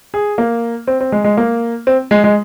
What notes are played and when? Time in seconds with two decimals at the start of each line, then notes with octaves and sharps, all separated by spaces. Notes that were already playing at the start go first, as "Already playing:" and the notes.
0.14 G#4
0.38 A#3
0.87 C4
1.01 C4
1.12 G#3
1.24 G#3
1.37 A#3
1.87 C4
2.11 G#3
2.24 G#3